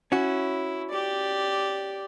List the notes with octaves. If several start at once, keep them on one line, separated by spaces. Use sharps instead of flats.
C#4 E4 F#4
G4 D5